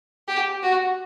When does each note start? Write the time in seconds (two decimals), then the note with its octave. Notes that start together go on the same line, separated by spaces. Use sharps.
0.28 G4
0.63 F#4